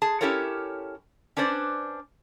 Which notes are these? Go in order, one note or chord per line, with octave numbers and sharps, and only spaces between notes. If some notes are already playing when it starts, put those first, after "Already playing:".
G#4 A5
C#4 E4 G4 A4 A#4 C#5
C#4 D4 B4 C5 D5